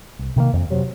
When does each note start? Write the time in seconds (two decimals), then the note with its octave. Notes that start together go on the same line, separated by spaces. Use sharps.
0.19 C2
0.36 C3 D#3 A#3
0.53 F2
0.70 C3 F#3